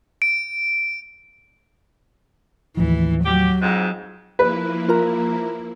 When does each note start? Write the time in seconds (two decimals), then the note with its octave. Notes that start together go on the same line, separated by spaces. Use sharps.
0.22 D7
2.77 D#2 A2 E3 F3
3.25 F#3 G4
3.61 F2 G#2
4.39 F3 A#3 E4 B4
4.88 F4 A#4 A#5